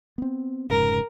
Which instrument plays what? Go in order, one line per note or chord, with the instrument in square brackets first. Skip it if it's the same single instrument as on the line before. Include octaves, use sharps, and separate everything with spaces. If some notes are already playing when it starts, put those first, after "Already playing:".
[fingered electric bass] B3 C4
[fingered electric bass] F1 G#2 C#3 [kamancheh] A#4